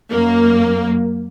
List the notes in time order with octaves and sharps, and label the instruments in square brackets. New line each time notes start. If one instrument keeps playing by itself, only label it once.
[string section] F#2 A#3